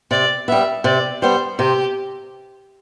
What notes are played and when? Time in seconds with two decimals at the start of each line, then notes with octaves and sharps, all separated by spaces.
0.11 C3 D5
0.48 G3 B3 E5
0.84 C3 D5
1.22 G3 B3 C5
1.59 C3 G4